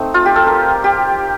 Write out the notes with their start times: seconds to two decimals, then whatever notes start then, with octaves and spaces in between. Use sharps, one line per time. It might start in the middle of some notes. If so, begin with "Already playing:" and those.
Already playing: A3 C4 D#4
0.14 F4
0.26 G4
0.36 A4
0.47 A#4
0.84 G4